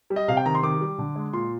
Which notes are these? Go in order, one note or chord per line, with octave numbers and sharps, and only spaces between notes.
G3
D#5
C3 F5
G5
D#3 A#5
C6
D#3 D6
G3
D3
G#3
A#2 C6